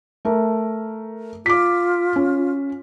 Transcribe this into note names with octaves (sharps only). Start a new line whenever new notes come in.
A3 A#4
F4 D6 B6
C#4